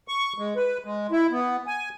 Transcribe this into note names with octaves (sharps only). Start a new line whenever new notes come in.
C#6
G#3
B4
G#3
E4
B3
G#5